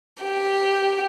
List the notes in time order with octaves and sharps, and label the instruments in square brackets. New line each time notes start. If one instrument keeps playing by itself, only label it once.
[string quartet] G4